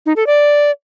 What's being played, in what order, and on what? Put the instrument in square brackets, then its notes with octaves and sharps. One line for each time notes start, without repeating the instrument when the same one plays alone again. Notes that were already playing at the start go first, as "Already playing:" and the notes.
[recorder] D#4
A4
D5